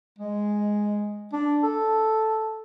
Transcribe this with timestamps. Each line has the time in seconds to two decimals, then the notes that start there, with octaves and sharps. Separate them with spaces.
0.18 G#3
1.32 D4
1.63 A4